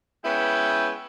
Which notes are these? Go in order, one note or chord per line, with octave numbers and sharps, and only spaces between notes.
G#3 B3 C#4 E4 B4 G5